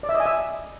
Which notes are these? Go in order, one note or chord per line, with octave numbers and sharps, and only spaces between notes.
D5
E5
D#5
G#5
E5